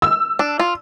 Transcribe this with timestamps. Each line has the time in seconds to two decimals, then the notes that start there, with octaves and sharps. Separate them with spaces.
0.02 E6
0.39 D4
0.59 F4